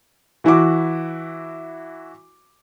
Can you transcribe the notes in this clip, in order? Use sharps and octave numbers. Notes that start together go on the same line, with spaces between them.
E3 E4 F#4 D6